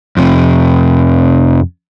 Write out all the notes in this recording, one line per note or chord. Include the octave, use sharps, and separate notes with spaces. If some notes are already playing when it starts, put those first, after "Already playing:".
F2 C3